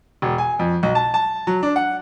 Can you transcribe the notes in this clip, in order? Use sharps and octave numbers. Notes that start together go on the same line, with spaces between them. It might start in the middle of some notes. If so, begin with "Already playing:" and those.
E1
G#5
F2
B1
A5
A5
F#3
D4
F#5